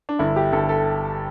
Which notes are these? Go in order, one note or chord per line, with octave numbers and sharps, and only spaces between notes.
D4
G1 E4
G4
G1 A4
A4